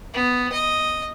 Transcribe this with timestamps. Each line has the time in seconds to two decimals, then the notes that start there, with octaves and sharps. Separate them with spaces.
0.14 B3
0.52 D#5